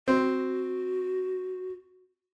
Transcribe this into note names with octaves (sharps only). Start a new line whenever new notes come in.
C4 F#4